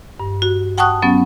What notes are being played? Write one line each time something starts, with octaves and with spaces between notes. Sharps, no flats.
G2
F#4
F#5 G5 A5 C#6 D#6 F#6
F#3 B3 C#4